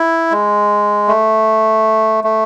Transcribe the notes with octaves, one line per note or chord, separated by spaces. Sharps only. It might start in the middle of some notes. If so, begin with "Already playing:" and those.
Already playing: E4
G#3
A3
A3